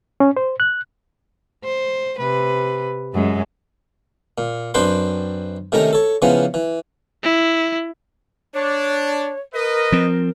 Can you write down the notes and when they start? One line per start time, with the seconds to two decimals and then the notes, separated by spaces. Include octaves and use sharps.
0.20 C#4
0.37 C5
0.60 F#6
1.64 C5
2.19 C3 B4
3.14 F#2 G#3
4.38 A#2
4.74 F#2 C4 D4 B4 G5 C6
5.72 C3 D#3 A3 C#4 A#5
5.93 A4 C#5
6.22 C#3 E3 F3 B3 C#4
6.54 E3
7.23 E4
8.54 D4 C#5
9.54 A#4 B4 D#5
9.92 F3 C4